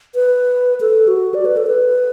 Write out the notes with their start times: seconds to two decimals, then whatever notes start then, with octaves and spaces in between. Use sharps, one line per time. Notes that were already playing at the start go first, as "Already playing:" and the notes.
0.15 B4
0.81 A4
1.08 F#4
1.34 D5
1.45 B4
1.57 A4
1.67 B4